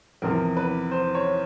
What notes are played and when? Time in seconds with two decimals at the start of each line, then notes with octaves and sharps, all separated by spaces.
0.22 E2 C3 F3 A#4
0.57 B4
0.91 C5
1.15 C#5